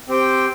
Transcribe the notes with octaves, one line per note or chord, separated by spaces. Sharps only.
C4 G4 C5 G5